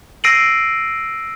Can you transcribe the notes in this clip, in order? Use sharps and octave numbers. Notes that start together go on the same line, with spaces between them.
E6 A#6 C7 D7 D#7 F#7